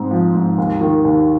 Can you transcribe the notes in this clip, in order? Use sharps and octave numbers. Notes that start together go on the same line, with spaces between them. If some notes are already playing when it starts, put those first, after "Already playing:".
Already playing: G#2 C4
F3
G#2
D#2
D#3
D#2